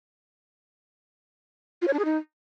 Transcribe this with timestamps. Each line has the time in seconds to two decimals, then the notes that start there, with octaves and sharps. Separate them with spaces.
1.82 F4
1.87 C#5
1.93 D4
1.99 G#4
2.05 D#4